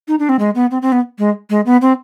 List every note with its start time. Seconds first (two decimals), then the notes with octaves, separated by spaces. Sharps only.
0.08 D#4
0.19 D4
0.29 C4
0.39 G#3
0.55 B3
0.71 C4
0.82 C4
0.92 B3
1.19 G#3
1.50 G#3
1.66 B3
1.82 C4